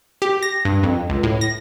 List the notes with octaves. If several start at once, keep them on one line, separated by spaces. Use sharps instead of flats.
G4
A#6
G2
F2
C#2
A2
A#6